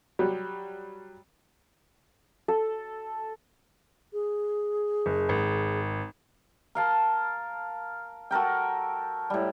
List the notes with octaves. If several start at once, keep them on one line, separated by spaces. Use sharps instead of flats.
F#3 G3
A4
G#4
F#1
G#1
A#4 F5 A5
F#4 A4 A#4 G5
A2 G3